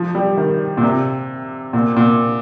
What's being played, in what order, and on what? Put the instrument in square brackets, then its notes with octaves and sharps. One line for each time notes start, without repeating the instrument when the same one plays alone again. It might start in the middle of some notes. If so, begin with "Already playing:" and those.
Already playing: [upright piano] F3
G3
D#3
A#2
C3
A#2
A#2